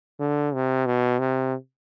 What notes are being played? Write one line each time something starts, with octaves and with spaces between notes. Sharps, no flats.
D3
C3
B2
C3